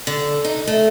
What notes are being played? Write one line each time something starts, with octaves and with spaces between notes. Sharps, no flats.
D3
D#4
A3